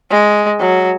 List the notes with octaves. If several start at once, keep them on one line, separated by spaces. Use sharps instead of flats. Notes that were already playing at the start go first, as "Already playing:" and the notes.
G#3
F#3